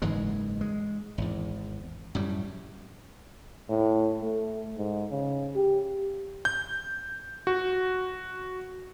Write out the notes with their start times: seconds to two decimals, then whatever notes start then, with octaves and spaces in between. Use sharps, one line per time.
0.02 F#1 G#2 E3 G#3
0.61 G#3
1.18 G#1 E2
2.15 F#2 A2 G3
3.69 A2
4.22 A3
4.78 G#2
5.11 C#3
5.56 G4
6.45 G6
7.47 F#4